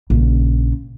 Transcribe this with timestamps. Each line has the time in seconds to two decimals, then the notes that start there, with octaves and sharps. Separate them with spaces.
0.10 A#1 C#3